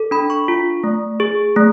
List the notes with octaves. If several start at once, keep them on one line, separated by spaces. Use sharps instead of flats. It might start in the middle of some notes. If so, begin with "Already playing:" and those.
Already playing: A4
D4 B5
C#6
F4
A3
G#4
A3